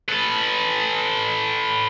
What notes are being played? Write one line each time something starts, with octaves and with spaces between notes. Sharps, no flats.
A4 B4